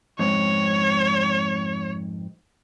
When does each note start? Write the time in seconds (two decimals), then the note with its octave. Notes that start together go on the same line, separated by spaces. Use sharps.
0.19 F2 G#2 C4 C#5